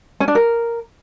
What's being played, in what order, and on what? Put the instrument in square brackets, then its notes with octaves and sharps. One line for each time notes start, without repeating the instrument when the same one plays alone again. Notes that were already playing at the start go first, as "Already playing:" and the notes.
[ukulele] C#4
D4
A#4